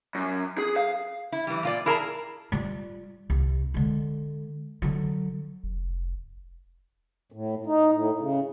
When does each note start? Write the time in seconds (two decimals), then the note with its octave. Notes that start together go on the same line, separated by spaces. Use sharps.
0.15 F#2
0.58 G#4
0.76 F5
1.32 E4
1.47 E3 G3
1.63 A#2 F4 D5
1.86 E4 G#4 A#4 A5 A#5
2.52 G3 F4
3.30 C2
3.74 D3 G#3
4.82 D3 F#3
5.63 F1
7.32 A2
7.66 D#4
7.92 A2
8.19 C#3